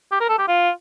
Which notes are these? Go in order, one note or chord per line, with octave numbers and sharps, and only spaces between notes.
G4
A#4
A4
G4
F4